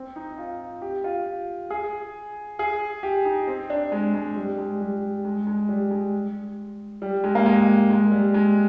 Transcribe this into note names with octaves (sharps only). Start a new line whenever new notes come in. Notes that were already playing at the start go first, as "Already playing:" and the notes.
Already playing: C4
D#4
F4
G4
F4
G#4
G#4
G4
D#4
C4
D4
G#3
G#3
G3
G#3
G3
G#3
G#3
G3
G#3
G3
G#3
A#3
G#3
G#3
G3
G#3